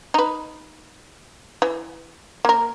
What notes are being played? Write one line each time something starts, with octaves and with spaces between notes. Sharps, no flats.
D#4 B4
E3
A#3 A#4